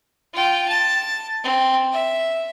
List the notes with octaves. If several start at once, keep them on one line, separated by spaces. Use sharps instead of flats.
F4 G5
A5
C4
E5